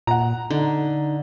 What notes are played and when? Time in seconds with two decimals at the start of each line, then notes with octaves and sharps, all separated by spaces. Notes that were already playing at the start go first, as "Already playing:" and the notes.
0.07 A#2 F#5 A#5
0.50 D3 D#4